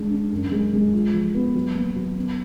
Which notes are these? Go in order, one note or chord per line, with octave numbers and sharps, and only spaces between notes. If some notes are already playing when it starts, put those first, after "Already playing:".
Already playing: G#3 D4
D4
F#2
G#3
G#3
F4
F3
B3
F#3
A#3
F#3
B3